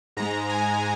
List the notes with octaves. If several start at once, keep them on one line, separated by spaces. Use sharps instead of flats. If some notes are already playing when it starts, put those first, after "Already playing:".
G#2 G#3 A#5
G#5